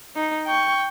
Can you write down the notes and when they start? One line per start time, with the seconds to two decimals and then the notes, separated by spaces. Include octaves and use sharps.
0.16 D#4
0.47 G5 C#6